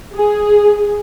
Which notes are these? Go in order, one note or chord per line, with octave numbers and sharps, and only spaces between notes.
G#4